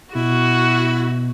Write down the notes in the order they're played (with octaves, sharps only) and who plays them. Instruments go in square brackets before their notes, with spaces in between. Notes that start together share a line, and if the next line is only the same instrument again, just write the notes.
[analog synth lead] B2 [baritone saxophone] E4 [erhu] F#4